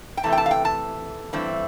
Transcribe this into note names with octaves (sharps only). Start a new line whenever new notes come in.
G5
C3 E3 A3 C4 A5
G5
A5
F5
G5
A5
G2 E3 A3 C4